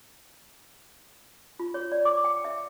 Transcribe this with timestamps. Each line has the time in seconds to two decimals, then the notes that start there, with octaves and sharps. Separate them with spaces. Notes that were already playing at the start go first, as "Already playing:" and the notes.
1.59 F4
1.74 C#5
1.92 D5
2.05 D6
2.24 G5
2.45 E5